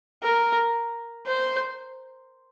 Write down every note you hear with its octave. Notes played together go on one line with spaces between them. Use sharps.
A#4
C5